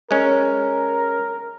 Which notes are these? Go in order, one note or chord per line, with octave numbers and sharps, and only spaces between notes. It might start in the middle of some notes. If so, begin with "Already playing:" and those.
G#3 C#4 A#4